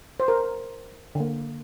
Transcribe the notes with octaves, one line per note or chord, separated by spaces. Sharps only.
C5
A#4
D3 A#3